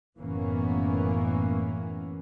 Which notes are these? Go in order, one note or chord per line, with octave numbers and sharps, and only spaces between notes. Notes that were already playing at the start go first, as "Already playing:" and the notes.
F#1 A2 E3 A#3 B3 C#4